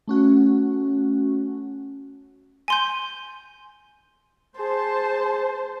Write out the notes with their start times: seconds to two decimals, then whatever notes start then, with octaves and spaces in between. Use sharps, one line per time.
0.08 A3 C#4 F#4
2.68 G#5 C6 G6
4.59 G#4 C5 A5